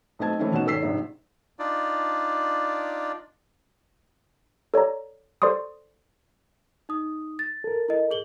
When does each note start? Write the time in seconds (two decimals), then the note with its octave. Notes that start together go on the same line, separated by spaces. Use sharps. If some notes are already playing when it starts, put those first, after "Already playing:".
0.19 B1 A3 C4 D#5 A5 G#6
0.39 D#3 E3 A3 C4 C#4 E4
0.53 B2 C#4 D#4 F#5 E7
0.66 G#1 A4 C#5 E6 B6 C7
0.82 A#1 G#2 C3
1.59 D4 D#4 F4 D5
4.74 A4 C#5 D5 A#5
5.42 A4 C5 D5 C6 C#6 D#6
6.89 D#4 D#6
7.39 A6
7.64 A4 A#4
7.88 E4 D#5
8.11 G#4 F#7 G7